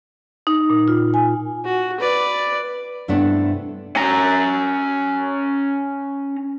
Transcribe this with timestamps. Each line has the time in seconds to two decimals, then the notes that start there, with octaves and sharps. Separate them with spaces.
0.47 D#4
0.70 A#2
0.88 F4
1.14 G#5
1.65 F#4
2.00 B4 D5
3.08 G2 C3 A3 B3 D4 E4
3.96 C#4 A#5